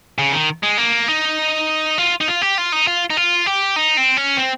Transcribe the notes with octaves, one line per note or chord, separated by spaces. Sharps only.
C#3
D#3
G#3
A#3
D#4
F4
D#4
F4
G4
F4
D#4
F4
D#4
F4
G4
D#4
C4
C#4
C4